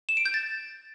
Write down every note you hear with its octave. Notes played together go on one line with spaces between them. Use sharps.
E7
D7
G6
A6